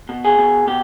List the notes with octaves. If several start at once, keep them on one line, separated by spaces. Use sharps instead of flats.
B2
G#4
B2
B2 G4